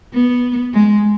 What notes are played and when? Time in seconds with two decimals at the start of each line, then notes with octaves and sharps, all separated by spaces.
0.14 B3
0.74 G#3